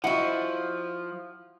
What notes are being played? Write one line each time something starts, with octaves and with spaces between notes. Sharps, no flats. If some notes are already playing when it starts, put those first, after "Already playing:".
F3 E4 F#4 D#5 F#5